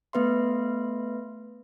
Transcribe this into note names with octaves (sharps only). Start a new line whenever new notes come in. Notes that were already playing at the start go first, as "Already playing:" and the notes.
A3 B3 B4 E5 C6